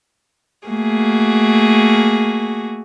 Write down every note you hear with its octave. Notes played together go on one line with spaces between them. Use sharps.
A3 A#3 F#4 G#4